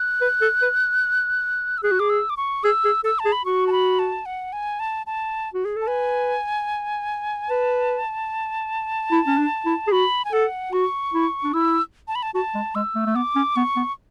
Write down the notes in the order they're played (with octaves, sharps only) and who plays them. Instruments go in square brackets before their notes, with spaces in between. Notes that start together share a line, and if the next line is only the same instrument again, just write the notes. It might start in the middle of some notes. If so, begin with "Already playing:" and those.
Already playing: [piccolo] F#6
[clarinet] B4
A4
B4
[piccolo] E6
[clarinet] G#4 [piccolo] F#6
[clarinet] F#4
[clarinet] G#4 [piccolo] D6
[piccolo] E6
D6
C#6
[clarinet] G#4 [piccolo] E6
[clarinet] G#4
[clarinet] A4 [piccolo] E6
[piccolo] A5
[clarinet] G#4
[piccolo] B5
[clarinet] F#4 [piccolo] C#6
[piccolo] A5
B5
A5
F#5
G#5
A5
A5
[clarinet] F#4
G#4
A4
[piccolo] A5
[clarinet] B4 [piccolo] G#5
[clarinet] B4 [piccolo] A5
[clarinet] E4
C#4
D4
E4
G#4
[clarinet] F#4 [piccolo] B5
[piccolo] G#5
[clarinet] A4 [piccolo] F#5
[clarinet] F#4 [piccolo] C#6
[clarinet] E4
D4
[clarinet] E4 [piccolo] E6
[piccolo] A5
B5
A5
[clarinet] F#4 [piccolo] A5
[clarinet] G#3
[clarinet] G#3 [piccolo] E6
[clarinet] A3
A3
[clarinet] B3 [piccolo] D6
[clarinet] C#4
[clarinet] B3 [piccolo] C#6
[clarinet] B3